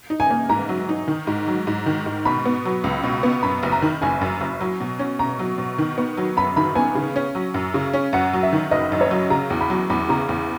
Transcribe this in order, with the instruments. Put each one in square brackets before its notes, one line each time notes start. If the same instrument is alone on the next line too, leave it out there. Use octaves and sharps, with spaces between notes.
[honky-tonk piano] D#4
[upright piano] G#5
[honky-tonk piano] A#3
[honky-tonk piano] G#2 [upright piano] A#5
[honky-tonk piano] F#3
D#4
D#3
G#2
F#3
G#2
D#3
G#2
[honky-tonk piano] B2 [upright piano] B5
[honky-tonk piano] B3
F#3
C#2
B2
B3
[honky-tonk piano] F#2 [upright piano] B5
[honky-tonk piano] F#1
[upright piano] A#5
[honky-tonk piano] D#3
[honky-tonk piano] F#1 [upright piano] G#5
[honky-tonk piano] F#2
F#1
F#3
B2
C#4
[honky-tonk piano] B2 [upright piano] A#5
[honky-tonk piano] F#3
B2
D#3
B3
F#3
[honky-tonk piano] F#2 [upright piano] B5
[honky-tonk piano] D#3 [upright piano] B5
[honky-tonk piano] B3 [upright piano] G#5
[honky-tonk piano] C#3
C#4
F#3
F#2
C#3
C#4
[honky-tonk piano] F#2 [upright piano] F#5
[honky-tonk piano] F#3
[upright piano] E5
[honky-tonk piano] D#3
[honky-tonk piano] F#1 [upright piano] D#5
[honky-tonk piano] F#2
[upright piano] C#5
[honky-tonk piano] F#3
[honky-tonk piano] C#3 [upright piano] A#5
[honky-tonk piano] E2
[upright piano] B5
[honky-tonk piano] F#3
[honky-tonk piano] E2 [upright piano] B5
[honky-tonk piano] C#3 [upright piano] A#5
[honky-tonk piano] E2